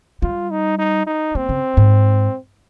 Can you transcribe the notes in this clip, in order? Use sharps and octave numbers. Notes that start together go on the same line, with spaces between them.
G3 F4
D#4
D#4
D#4
A#3 C4
C#3
G#2